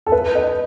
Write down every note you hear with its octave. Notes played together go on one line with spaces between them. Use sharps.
A4
B4
D#5